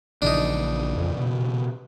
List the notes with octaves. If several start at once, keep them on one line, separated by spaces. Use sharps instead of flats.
A#1 A#2 C#3 E3 D4 D#4
F2
B2